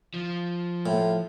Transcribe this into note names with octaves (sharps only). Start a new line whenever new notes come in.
F3
A2